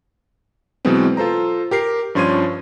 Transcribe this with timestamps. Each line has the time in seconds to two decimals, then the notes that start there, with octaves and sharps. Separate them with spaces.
0.85 B2 E3 F#3 G#3 B3 C4
1.17 F4 A4 C5 A#5
1.71 G4 A#4 C7
2.15 G2 F3 C#4 C6 G#6 D#7